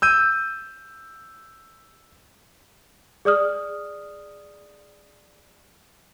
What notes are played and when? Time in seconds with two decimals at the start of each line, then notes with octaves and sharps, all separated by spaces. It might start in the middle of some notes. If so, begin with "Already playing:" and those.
0.02 E6 G6 D#7
3.25 G#4 D5 D#6 F6